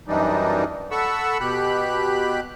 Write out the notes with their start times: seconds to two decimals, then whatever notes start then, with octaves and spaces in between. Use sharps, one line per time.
0.08 F#2 E3 G3 D4 D#4
0.91 A4 F#5 B5 C#6 E6
1.40 B2 G4 B5 F#6